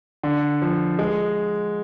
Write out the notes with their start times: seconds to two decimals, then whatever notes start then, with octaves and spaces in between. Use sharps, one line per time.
0.23 D3
0.62 F3
0.99 G#3